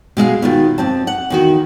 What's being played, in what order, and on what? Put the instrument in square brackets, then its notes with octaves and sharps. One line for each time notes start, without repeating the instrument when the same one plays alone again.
[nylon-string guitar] B2 G#3 E5 F5
B2 D#3 F4
F2 C4 A5
F#5
E2 D#3 F#4